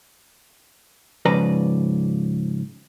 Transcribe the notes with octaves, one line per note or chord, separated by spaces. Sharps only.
G#2 C#3 F3 B4 D5 A#5